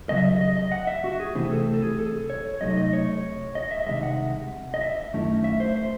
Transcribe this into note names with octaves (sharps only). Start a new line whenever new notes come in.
D#2 C#3 F#3 D#5
E5
D#5
D#5
D#5
F#5
E5
F#4
G#4
C3 E3 A3 C4 E4 G#4
A4
A4
G#4
A4
C#5
C2 C3 F#3 A3 D#4 D#5
D#5
C#5
D#5
E5
D#5
C2 C3 D#3 G#3 E5
F#5
D#5
E5
F#2 D#3 A3 C#4 E4
E5
C5
C5